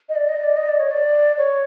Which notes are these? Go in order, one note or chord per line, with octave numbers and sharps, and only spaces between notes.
D#5
D5
D#5
D5
D#5
D5
C#5
D5
C#5